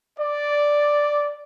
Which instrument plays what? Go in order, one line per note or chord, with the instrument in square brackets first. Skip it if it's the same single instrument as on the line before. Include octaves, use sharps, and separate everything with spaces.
[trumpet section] D5